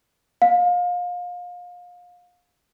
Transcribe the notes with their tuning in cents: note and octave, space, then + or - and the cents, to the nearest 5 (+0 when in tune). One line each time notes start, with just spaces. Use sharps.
F5 +30